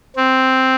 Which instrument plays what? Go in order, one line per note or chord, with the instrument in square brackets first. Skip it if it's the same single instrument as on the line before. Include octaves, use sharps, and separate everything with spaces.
[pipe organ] C4